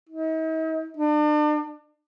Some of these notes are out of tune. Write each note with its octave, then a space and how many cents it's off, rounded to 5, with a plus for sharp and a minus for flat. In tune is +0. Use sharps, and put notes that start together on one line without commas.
D#4 +45
D4 +40